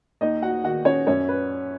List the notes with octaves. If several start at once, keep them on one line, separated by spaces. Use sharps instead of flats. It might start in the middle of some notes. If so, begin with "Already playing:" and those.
D#2 D#4 D#5
F#4 F#5
D#3 F#4 F#5
C#4 C#5
F#2 C#4 C#5
B4